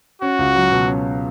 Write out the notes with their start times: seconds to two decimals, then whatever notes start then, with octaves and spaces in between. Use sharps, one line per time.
0.22 C#4 F#4
0.39 C#2
0.55 F#3
0.72 B2
0.88 C#4